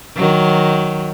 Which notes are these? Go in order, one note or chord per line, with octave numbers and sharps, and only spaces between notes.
D#3 F#3